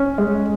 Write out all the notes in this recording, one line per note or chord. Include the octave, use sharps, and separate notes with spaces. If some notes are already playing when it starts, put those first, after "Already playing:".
Already playing: C#4
G#3